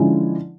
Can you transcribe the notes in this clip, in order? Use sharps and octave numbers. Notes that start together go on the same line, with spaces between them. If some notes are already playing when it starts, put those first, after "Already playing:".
Already playing: D3 F3 G#3 C#4 E4